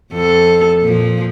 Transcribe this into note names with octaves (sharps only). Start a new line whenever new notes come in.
F2 A4
A#2 F3